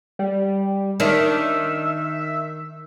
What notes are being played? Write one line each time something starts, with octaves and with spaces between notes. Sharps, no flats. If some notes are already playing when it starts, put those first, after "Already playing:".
G3
D#3 D4 E5